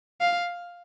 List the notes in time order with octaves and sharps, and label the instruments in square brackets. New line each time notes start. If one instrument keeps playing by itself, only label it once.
[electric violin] F5